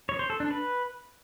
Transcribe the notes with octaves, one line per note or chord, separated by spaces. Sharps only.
C#5
C5
A4
D4
B4